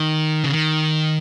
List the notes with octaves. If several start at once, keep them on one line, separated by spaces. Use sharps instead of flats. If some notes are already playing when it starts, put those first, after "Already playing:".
Already playing: D#3
C#3
D#3